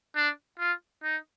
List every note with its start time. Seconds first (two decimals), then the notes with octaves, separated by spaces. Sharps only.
0.16 D4
0.59 F4
1.03 D#4